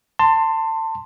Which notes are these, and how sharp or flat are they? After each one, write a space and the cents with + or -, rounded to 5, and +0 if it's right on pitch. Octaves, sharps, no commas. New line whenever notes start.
A5 +25 C6 +0